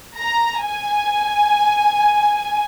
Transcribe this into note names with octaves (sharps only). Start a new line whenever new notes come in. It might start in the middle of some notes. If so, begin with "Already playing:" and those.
A#5
G#5